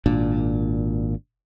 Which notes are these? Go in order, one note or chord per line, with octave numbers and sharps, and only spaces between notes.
G#1 A#2 D4